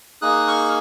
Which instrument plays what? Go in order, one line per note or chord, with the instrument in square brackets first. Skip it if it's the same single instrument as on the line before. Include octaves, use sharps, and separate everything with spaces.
[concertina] A#3 D#4 G#4 D#6 F#6
C#6 F6